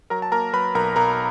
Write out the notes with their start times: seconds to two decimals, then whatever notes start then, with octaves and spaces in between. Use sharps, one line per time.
0.10 F#3 A#4 A#5
0.22 A5
0.32 A#3 A#4 A#5
0.53 F#3 B4 B5
0.75 B1 A#4 A#5
0.96 B1 A#4 A#5